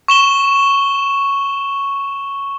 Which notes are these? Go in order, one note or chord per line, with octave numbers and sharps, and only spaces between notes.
C#6 E7 G7